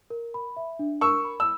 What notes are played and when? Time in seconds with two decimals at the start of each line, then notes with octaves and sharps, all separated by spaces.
0.10 A#4
0.34 B5
0.57 E5
0.79 D4
1.01 A#4 C#6 E6
1.24 B5
1.40 E6